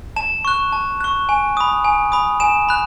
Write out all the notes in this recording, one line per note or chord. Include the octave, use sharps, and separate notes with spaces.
A5 E7
C#6 F#6
A5
C#6 F#6
G#5
B5 D#6
G#5
B5 D#6
G#5 E7
B5 F#6